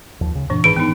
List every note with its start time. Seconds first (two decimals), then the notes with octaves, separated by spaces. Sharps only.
0.21 D#2 F3
0.34 C#2 C#3
0.50 F#2 A#2 E3 D4
0.64 G#2 D#3 D4 G#4 B4 B5 D7
0.76 B3 D#4